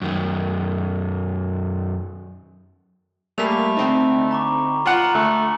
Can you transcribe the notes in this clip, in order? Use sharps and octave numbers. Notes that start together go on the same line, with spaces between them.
F#2 D#3
G3 A3 A#3 G#4 B5 B6 F7
D3 C4 D#4
A#5 C#6 D6
F4 F#5 G#5 A#5 F#7
D3 A3